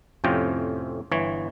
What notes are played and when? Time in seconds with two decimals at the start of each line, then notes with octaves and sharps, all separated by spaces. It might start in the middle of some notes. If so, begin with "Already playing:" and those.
0.24 F2 A2 C3 C#4 F4 G5
1.11 G1 E3 C#5